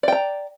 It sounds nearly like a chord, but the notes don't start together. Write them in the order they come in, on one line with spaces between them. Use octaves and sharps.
D5 G5 A#5